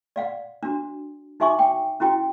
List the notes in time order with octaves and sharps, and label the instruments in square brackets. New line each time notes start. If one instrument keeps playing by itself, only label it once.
[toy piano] D5 F5 F#5
D4 F#4
D#4 F#4 E5 G#5 C#6 D6
G5
C#4 E4 F#4 G5